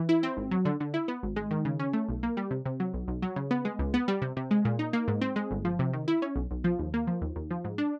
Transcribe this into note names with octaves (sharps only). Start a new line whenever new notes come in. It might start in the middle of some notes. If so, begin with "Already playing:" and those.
Already playing: E3
E4
C4
G#1
F#3
D3
D3
E4
B3
G#1
G#3
D#3
C#3
C#4
A3
B1
A#3
G3
C3
C3
F#3
B1
B1
F#3
C#3
B3
G#3
C#2
B3
G3
C3
C3
G#3
A#2
D#4
A#3
G#2
C4
G#3
G1
F3
C3
D#3
E4
C#4
B1
B1
F3
D#2
A#3
F3
D#2
D#2
F3
G#2
D4